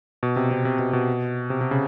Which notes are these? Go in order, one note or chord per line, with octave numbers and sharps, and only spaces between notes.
B2
C3
C3
C3
B2
B2
C3
C3
C#3